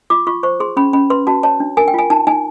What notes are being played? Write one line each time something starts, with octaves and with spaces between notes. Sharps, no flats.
F4 D6
F4 C#6
C5 C#6
G#4 C6
C#4 B5
C#4 B5
B4 C6
F#4 A5
C#5 A5
D4
A#4 G#5
G5
F4 G#5
D#4 A5
D#4 G#5